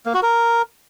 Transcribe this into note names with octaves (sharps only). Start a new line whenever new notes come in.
A#3
F#4
A#4